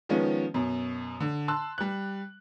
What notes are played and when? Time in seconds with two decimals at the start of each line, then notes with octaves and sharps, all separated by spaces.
0.09 D#3 F3 G#3 B3 C#4
0.54 F#2 B2
1.20 D3
1.48 A5 C6 E6 F#6
1.78 G3 F#6